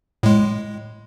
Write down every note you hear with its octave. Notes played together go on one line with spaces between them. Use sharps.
A2 G#3